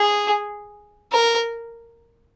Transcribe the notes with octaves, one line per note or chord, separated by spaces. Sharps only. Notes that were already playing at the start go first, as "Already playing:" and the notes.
Already playing: G#4
A#4